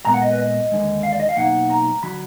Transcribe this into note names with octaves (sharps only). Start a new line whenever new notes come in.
A#2 G#3 B3 A#5
F#5
D#5
B4
D#5
D#2 D3 G#3
F5
D5
D#5
F5
B2 F#3 A#3 D#4 F#5
A#5
D3 F#3 B5